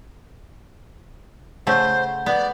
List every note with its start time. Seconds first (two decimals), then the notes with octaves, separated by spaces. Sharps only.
1.67 C#3 A3 C5 F#5 G6
2.26 B3 D5